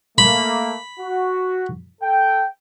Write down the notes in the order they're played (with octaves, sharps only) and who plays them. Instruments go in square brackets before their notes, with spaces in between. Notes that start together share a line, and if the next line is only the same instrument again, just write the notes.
[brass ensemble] A3 A#3 [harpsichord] B5
[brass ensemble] F#4
A4 G5